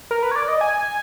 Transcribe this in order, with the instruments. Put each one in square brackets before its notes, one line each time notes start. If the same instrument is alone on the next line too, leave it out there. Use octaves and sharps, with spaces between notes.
[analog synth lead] A#4
B4
C#5
D5
D#5
G#5